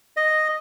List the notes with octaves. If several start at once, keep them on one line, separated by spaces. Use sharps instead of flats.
D#5